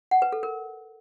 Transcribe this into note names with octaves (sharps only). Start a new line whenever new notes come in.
F#5
B4
A4
A#4